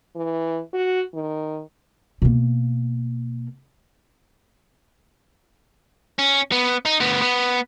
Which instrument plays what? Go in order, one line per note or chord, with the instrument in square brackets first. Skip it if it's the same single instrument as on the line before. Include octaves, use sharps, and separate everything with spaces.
[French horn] E3
F#4
D#3
[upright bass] B2 A#3
[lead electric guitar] C#4
B3
D#4
D2 B3
B3